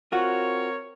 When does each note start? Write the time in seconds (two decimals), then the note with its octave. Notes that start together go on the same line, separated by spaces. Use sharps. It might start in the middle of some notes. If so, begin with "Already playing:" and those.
0.12 C4 F4 F#4 A#4 C#5